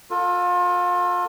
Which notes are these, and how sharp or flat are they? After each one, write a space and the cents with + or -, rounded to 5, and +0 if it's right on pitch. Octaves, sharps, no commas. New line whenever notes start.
F4 +30 A4 +35